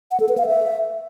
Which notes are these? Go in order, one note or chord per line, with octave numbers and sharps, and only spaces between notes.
F#5
A4
B4
F5
E5